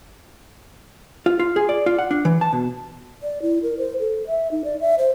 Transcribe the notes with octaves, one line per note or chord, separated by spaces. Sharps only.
F4
F4
G#4
D5
F4
F#5
D4
E3
A5
B2
D5
E4
A#4
C5
A4
E5
D#4
D5
E5
C5